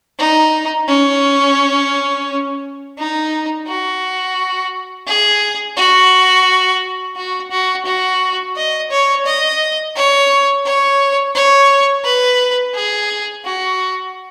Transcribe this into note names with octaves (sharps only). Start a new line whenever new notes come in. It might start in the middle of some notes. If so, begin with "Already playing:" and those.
D#4
C#4
D#4
F#4
G#4
F#4
F#4
F#4
F#4
D#5
C#5
D#5
C#5
C#5
C#5
B4
G#4
F#4